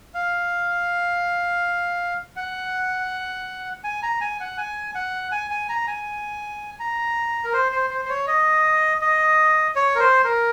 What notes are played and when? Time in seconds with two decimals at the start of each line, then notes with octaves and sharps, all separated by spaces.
0.14 F5
2.36 F#5
3.84 G#5
4.03 A#5
4.21 G#5
4.40 F#5
4.58 G#5
4.95 F#5
5.32 G#5
5.51 G#5
5.69 A#5
5.87 G#5
6.80 A#5
7.45 A#4
7.53 C5
7.72 C5
7.90 C5
8.05 C5
8.09 C#5
8.27 D#5
9.01 D#5
9.76 C#5
9.95 A#4
10.00 C5
10.24 A#4